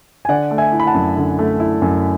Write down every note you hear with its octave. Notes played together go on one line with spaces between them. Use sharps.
G#5
D3 D5 F#5
A3
E5 G#5
E4
B5
F#5 A5
F#2
D3
A3
E4
F#2